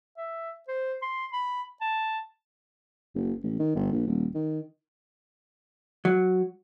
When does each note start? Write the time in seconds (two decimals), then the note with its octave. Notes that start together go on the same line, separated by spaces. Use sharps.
0.17 E5
0.68 C5
1.02 C6
1.33 B5
1.81 A5
3.15 F#1
3.43 A1
3.59 D#3
3.75 G1
3.92 A#1
4.07 D#1
4.35 D#3
6.05 F#3